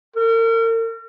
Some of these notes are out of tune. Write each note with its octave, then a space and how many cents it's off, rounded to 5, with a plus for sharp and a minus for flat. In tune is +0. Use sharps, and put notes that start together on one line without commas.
A#4 -40